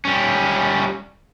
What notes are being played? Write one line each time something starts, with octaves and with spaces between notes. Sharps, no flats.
G3 C#4